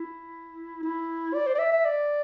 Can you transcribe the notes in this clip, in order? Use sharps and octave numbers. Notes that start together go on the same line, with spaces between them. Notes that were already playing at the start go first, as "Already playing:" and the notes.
Already playing: E4
E4
D5
C5
D5
E5
E5
D5